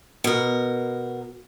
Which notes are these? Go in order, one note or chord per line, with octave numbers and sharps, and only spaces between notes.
B2 A#4